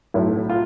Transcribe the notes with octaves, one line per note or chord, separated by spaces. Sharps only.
B1 A2 F#3 E4
F4